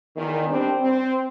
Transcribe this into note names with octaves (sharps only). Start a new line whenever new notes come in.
E2 D#3
G3 C4 D4
C4